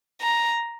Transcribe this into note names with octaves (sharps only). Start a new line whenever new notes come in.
A#5